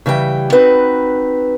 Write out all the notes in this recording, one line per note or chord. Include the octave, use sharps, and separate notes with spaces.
C#3 E3 G3 D#5 G5
C4 D#4 F#4 B4